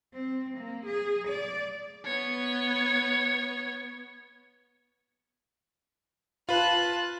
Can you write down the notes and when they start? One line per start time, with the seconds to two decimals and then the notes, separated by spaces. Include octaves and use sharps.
0.14 C4
0.58 A#3
0.86 G#4
1.28 D5
2.05 B3 C#5
6.49 F4 B4 A5 F#6